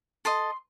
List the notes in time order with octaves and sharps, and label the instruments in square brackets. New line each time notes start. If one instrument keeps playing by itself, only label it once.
[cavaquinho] A4 D#5 C6